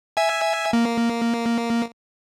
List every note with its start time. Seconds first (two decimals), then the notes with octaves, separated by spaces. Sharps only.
0.17 E5 G#5
0.73 A#3